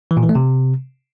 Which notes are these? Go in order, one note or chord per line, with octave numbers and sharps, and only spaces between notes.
E3
A#2
E3
A3
C3